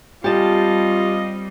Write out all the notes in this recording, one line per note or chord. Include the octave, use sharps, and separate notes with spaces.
G3 C4 F4 G4 D#5 F5 A5